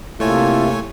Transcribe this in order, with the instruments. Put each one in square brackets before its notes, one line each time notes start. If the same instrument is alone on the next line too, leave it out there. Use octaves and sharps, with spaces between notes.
[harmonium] C3 A#3 [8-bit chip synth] A3 C#5 G#5 [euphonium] E4 [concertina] F4 A4